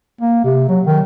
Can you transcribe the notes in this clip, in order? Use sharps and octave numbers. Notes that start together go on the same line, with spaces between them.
A#3
C3
F#3
D#3